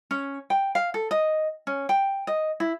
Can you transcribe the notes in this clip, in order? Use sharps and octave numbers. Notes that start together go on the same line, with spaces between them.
C#4
G5
F5
A4
D#5
C#4
G5
D#5
E4